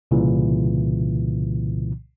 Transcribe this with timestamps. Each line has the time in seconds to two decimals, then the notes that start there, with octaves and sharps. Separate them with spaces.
0.11 C2 A#2 C#3 E3